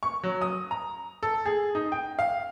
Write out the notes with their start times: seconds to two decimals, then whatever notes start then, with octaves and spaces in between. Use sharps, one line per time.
0.03 C#6
0.23 F#3
0.41 D#6
0.71 A#5
1.23 A4
1.46 G#4
1.75 D#4
1.92 G5
2.19 F5